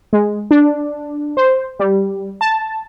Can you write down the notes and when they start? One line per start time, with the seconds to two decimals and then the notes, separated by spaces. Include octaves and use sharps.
0.13 G#3
0.51 D4
1.37 C5
1.79 G3
2.41 A5